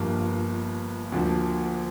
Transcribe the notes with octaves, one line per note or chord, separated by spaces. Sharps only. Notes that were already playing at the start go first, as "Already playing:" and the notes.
Already playing: G1 G2 F3 A#3
D2 D3 F3 A#3